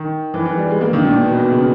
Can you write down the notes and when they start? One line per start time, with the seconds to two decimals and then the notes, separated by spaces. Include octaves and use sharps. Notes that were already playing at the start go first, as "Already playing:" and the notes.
Already playing: D#3
0.34 E3
0.46 E3
0.58 G3
0.70 G#3
0.81 A#3
0.93 D#3
1.05 A#2
1.16 B2
1.28 B2
1.40 B2
1.51 C#3